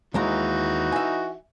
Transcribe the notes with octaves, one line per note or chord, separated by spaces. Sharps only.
D#2 E3 G#3 D#4 F#4 A#5
E5 G#5